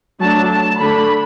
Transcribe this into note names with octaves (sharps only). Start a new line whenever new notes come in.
F#3 A3 D4 A5
A5
D3 A3 D4 B5